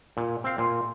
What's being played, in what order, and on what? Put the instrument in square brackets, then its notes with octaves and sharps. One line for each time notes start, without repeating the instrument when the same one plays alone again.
[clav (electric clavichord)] A#2
C4 F5
[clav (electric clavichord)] A#2 [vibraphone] C6